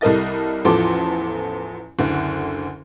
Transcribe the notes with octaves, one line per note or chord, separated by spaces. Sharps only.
C2 G3 A4 A#4 D#5 A6
A1 E2 F3 A4 C6 D6
F#1 D2 D3